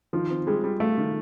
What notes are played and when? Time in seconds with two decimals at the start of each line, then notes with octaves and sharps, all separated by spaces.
0.13 D#3 F3
0.30 C4
0.47 G3 G#3
0.64 G3
0.80 A3 F4
0.98 D#3